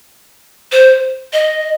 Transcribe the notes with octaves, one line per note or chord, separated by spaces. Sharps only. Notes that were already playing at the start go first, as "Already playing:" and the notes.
C5
D#5